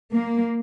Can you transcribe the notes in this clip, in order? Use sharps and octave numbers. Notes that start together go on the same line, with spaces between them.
A#3